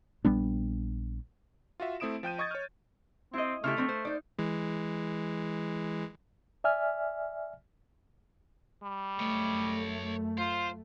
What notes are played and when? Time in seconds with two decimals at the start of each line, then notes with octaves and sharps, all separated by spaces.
0.25 A#1 G3 B3 D4
1.80 F4 F#4 E5
2.00 A3 C4 E4 D#6 D7 E7
2.23 F3 G5 G6 D#7
2.38 D#5 C#6 D#6 G#6 A6
2.51 C#5 F6
3.33 C4 E4 D#5
3.64 C#3 A3 E4 G4 E5 C6 F6
3.77 F#3 C4 D4
3.89 C5
4.05 D#4 C5 D5
4.39 E3 G#3
6.64 D5 E5 G#5 F6
8.83 G3
9.19 F#2 A3 C#5 D#5
10.38 F4 C5